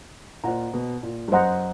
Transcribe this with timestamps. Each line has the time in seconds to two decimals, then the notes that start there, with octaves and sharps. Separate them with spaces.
0.44 A#2 C5 D#5 F#5 A#5
0.73 B2
1.03 A#2
1.28 G2
1.32 F#2 C5 D#5 F#5 A#5